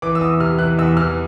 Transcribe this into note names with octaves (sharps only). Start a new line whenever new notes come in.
E3 D6
E6
E2 D#6
C3 F6
E3 F#6
E2 E6
E3 F6